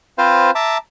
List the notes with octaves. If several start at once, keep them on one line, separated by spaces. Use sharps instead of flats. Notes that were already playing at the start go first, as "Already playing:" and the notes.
C4 F4 B4 C5 F5
E5 A5 A#5 D6